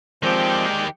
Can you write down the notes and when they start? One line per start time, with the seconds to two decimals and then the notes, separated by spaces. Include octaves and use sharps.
0.23 D#3 F3 G#3 C4 G4 D5 G5